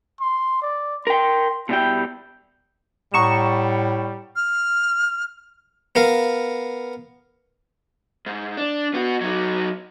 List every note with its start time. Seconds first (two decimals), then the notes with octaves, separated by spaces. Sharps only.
0.21 C6
0.62 D5
1.07 A#4 G5 C6
1.69 B2 G3 E4 G5
3.14 A2 G3 F#5 A#5 C#6 D#6 C#7 E7
4.35 F6
5.95 B3 A#4 F5
8.26 G#2
8.57 D4
8.94 B3 F#4
9.21 F#3 D#4